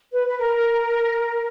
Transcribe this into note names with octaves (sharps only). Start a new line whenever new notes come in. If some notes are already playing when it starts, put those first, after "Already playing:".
B4
B4
A#4